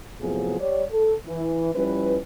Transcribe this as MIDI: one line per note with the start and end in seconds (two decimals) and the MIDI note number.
0.19 0.58 45
0.19 0.58 48
0.19 0.58 53
0.19 0.58 54
0.19 0.58 59
0.19 0.58 68
0.59 0.84 55
0.59 0.84 73
0.59 0.84 74
0.91 1.14 69
1.27 1.70 52
1.75 2.18 53
1.75 2.18 55
1.75 2.18 61
1.75 2.18 64
1.75 2.18 71